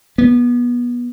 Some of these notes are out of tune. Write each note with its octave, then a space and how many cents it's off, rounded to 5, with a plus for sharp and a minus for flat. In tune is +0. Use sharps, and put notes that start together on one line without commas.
B3 -25